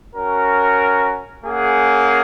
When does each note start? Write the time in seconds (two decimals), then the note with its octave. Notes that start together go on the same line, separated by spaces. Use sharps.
0.15 C#4 F#4 A#4
1.44 A#3 C#4 G#4 F#5